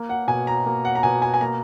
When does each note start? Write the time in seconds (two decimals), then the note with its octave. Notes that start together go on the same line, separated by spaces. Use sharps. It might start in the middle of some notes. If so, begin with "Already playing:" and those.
Already playing: A#3
0.09 F#5
0.28 B2 G#5
0.47 A#5
0.66 A#3
0.85 F#5
0.95 A#5
1.03 B2 G#5
1.22 G#5
1.34 G#5
1.41 A#3 A#5